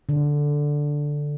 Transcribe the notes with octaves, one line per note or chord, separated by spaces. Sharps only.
D3